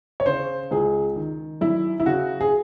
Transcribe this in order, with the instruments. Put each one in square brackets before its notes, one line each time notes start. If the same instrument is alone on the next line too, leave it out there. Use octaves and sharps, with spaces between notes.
[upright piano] C#5
C#3 C5
C#2 G#4
D#3
F#2 E4
E4
C#3 F#4
G#4